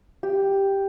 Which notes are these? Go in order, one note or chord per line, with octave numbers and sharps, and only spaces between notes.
G4